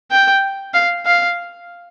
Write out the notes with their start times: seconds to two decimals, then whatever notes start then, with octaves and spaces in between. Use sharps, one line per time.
0.11 G5
0.74 F5
1.06 F5